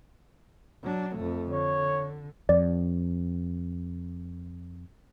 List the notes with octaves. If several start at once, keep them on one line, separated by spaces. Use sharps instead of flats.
F#3 D4
F2 A3
D3 C#5
F2 D5